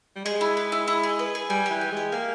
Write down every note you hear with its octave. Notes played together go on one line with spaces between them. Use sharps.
G3
G#3 G#4
E4
B4
E4
E4
G#4
B4
G#4
G3 G#5
E3 G4
G#5
G#3
G4
A#3 G#5